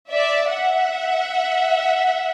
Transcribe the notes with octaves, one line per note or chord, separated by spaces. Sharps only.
D5 E5
E5 F#5